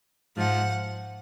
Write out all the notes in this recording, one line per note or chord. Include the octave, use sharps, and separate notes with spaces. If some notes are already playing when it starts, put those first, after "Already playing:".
G#2 F3 F#5